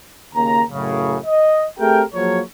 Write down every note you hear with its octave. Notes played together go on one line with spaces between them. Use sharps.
D#2 C#3 A#3 A#5
F#2 A2 C#3
D#5
A3 C4 G4 G#4 A#4 G5
F3 F#3 A#3 G#4 A#4 C#5